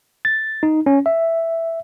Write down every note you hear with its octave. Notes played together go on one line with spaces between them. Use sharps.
A6
D#4
C#4
E5